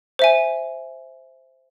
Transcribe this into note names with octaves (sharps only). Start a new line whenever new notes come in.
C5 E5 G#5